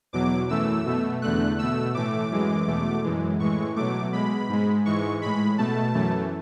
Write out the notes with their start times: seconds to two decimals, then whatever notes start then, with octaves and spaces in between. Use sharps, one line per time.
0.13 E2 B2 F#3 D6
0.49 F#2 E3 A3 E6
0.86 B2 A3
1.22 E2 D3 A3 F#6
1.58 B2 A3 E6
1.94 A2 E3 A3 D6
2.31 F#2 E3 G#3
2.68 E2 B2 A3
3.03 F#2 E3 G#3
3.40 A2 E3 G#3 C#6
3.76 B2 F#3 A3 D6
4.13 B2 G#3 B5
4.49 G#2 G#3
4.85 G#2 E3 G#3 C#6
5.21 A2 G#3 B5
5.58 B2 A3 A5
5.94 F#2 E3 A3